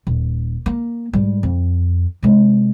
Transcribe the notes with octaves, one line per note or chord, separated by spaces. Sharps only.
D#1
A#3
G#2 G3
F2
C3 G#3